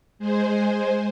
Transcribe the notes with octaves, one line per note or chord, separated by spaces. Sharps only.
G#3 G#4 C5